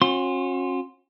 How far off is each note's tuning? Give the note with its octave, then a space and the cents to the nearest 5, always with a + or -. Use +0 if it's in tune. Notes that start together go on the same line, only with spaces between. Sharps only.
C#4 -40 F#4 -40 C6 +0